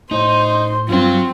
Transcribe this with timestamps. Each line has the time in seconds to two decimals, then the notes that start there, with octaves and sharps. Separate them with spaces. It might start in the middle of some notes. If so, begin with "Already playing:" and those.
0.11 A2 D#4 C5
0.89 G2 F#3 C4 F4 F#5